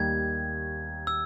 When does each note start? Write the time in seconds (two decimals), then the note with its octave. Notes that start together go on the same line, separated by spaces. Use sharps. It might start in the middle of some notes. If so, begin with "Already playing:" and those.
Already playing: D#2 D#3 G3 G#6
1.07 E6